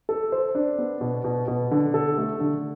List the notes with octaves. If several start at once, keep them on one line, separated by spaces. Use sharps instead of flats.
A4
C5
D4
B3
B2
B2
B2
D3
A4
A3
D3